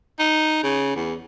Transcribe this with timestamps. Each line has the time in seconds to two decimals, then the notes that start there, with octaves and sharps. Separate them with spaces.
0.20 D#4
0.63 C#3
0.95 E2